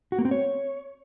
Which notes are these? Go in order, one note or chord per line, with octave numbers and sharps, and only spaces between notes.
F#4
A#3
C4
C#5